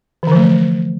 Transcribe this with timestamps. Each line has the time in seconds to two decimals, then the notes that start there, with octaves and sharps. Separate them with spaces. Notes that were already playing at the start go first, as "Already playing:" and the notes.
0.23 E3
0.27 D3
0.32 F3
0.36 A3